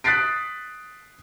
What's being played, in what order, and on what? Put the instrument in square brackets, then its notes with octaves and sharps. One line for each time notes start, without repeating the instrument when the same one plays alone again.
[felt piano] D#6 F#6 A6 B6 C7 D7